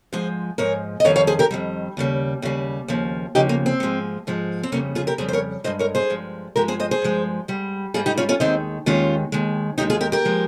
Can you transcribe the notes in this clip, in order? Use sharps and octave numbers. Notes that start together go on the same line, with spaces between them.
G#2 F3 G#3 G#4 C5
G#2 F3 G#3 A#4 C#5
D#5
F2 D#3 G3 C#5 F5
C#5 F5
G#4 C5
G4 A#4
F2 D#3 G3
D#2 C#3 G3
D#2 C#3 G3
D#2 C#3 F3
D#2 C#3 F3 D#4 G4
A#3
C4
G#2 F3 G#3
G#2 F3 G#3
C4
F2 C#3 G3 A#3 C#4
F4 G#4
G4 A#4
F2 C#3 G3 G#4 C5
C5
A#4 C#5
G2 F3 G#3 C5 D#5
A#4 C#5
G#4 C5
G2 F3 G#3
G2 F3 G#3 G4 A#4
G#4 C5
C5 D#5
G#4 C5
G2 F3 G#3
G#2 G3
G#2 G3 F4 G#4
D#4 G4
C#4 F4
C#4 F4
D#2 D#3 G#3 C4 D#4
D#2 D#3 G#3 C#4 F4
D#2 D#3 G#3
D#2 D#3 G#3 D#4 G4
F4 G#4
G4 A#4
G4 A#4
F3 G#3